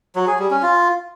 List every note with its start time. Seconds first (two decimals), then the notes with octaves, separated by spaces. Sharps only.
0.16 F#3
0.27 G#4
0.39 G3
0.51 C#4
0.62 F4